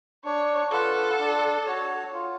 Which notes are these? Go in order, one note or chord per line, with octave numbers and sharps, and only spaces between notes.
D4 C#5
F4 A4 B4 F#5
D4
F#4 C#5
F4